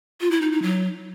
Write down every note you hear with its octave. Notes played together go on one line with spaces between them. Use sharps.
F4
E4
D#4
D#4
F#3